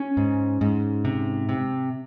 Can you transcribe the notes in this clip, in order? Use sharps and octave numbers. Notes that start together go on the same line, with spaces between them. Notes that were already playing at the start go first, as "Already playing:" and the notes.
Already playing: C#4
G#2
G#2
C3
C3